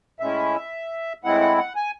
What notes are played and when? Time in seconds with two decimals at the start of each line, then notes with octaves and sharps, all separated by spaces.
0.20 A2 G#3 C#4 E4 E5
1.24 A2 G#3 C4 E4 F#5
1.41 F#5
1.58 F#5
1.76 G#5